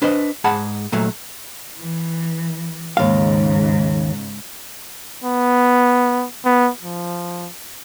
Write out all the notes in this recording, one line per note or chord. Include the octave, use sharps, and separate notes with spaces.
D4 B4 C5 D#5
G#2 G#4 F#5 A5 B5
A#2 F#3 A3
E3
D#2 G#2 C#3 F5
B3
B3
F3